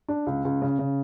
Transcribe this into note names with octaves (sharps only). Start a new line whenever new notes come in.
D4
C#2
C#2
C#3
C#3